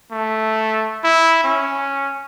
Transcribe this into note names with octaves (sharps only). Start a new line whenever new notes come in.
A3
E4
C#4